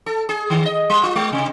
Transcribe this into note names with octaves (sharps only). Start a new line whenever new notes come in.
A4
G#4
D#3
D#5
G3
F4
G#3
C3